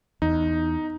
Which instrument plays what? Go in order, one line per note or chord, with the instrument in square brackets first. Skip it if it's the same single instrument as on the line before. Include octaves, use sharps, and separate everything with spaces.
[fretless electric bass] E2 [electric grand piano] D#4